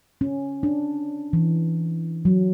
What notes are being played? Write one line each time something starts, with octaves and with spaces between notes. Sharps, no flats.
C#4
D4
E3
F#3